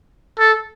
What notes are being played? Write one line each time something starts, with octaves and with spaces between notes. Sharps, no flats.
A4